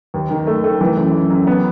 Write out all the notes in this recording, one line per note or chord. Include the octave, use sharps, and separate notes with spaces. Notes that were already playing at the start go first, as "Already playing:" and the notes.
D#2
D#3
A3
A3
E3
F#2
F#2
F#2
B3